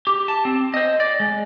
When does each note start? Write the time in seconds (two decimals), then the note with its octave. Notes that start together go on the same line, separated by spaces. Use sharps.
0.07 G4
0.28 A5
0.45 C4
0.74 C5 D#5
1.00 D5
1.20 G#3